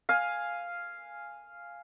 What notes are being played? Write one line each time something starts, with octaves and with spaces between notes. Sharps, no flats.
F5 G#5